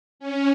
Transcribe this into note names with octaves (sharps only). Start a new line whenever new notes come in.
C#4